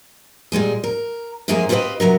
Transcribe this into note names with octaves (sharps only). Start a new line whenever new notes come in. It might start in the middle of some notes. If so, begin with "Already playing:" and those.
A#2 G3 G#3 G#4
A#4
F#2 F3 G#3 A#3 G#4 A#4
C4 F4 G4 G#4 B4 D#5
C3 F#3 B3 A#4